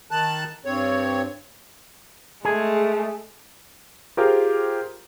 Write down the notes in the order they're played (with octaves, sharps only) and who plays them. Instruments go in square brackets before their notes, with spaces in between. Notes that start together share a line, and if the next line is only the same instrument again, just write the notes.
[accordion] D#3 A5 F#6
G2 C4 C#5
[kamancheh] G#3 A3 [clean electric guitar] G#4
[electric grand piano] F4 G4 G#4 A#4 C5 F5